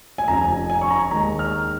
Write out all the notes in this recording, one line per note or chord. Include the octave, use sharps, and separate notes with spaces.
G#5
F1 F2 F3 C#4 A#5
G#5
G#5
C#6
A#5
D#2 D#3 G#3 D#4 A#5
F6